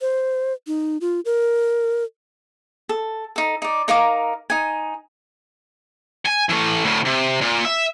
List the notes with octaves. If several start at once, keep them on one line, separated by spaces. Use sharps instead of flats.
C5
D#4
F4
A#4
A4
D#4 A4
D#4 D5
D#4 A#4 F5 D6
D#4 G#5
G#5
E3 A3
D2 A2
C3
A#2
E5